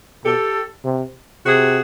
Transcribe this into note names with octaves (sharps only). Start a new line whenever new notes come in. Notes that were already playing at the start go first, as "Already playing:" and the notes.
B2 G4 A4
C3
C3 F#4 G#4